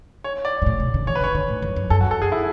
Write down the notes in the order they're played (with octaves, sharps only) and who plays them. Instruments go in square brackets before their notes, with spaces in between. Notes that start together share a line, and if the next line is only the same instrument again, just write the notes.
[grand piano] C#5
D5
[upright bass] G#2
A2
B2
C#3
[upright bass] E3 [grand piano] C#5
[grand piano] B4
[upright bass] D3
[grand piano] C#5
[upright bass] D3
A2
F#2
F#2
[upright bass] F#2 [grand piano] A4
[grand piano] F#4
A4
G#4
E4